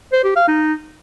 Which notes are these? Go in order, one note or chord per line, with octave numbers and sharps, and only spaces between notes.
C5
G4
F5
D#4